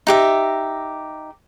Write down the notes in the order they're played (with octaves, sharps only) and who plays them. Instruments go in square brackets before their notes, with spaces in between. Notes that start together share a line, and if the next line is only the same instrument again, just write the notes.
[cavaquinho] D#4 G4 E5